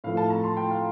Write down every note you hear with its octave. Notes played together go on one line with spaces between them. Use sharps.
A2 F3 A3 F5
A5
A#5
C6
G5
F5